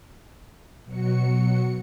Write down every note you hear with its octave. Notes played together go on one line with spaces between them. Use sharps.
B2 F#3 F#4 C#7